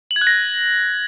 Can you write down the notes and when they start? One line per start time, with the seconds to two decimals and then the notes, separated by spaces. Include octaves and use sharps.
0.11 F#7
0.16 G#6
0.21 F#6
0.27 A#6